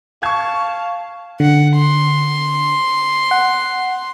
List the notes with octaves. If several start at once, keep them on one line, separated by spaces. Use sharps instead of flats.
F5 A5 C#6 G#6
D3 F#5
C6
F#5